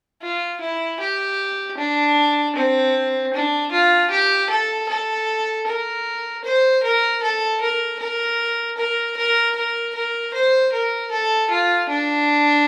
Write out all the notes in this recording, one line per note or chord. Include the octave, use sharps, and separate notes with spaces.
F4
E4
G4
D4
C4
D4
F4
G4
A4
A4
A#4
C5
A#4
A4
A#4
A#4
A#4
A#4
A#4
A#4
C5
A#4
A4
F4
D4